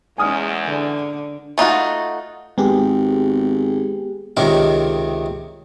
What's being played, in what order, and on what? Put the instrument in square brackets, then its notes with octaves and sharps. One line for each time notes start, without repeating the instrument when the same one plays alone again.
[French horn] E2 [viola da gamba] G#3 C#4 [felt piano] G#5 D#6 F6
[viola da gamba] D3
[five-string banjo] A3 D#4 F4 F#4
[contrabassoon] G#1 [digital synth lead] G#3 [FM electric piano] B3 G4 G#4
[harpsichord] C#2 C3 D#3 A#4